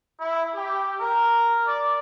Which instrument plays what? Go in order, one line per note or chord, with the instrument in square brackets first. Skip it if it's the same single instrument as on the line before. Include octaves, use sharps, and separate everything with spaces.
[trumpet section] E4
G4
A#4
D5